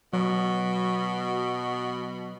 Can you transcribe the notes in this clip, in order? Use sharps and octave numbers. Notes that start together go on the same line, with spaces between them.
B2 F#3